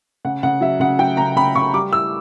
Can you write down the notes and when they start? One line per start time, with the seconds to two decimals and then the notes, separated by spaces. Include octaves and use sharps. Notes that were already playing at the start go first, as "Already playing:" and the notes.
0.25 C#3 F#5
0.43 C#3 F#5
0.61 F#3 E5
0.80 C#3 F#5
0.99 F#3 G5
1.17 C#3 A#5
1.36 C#3 B5
1.55 C#3 C#6
1.73 G3 D6
1.92 E4 E6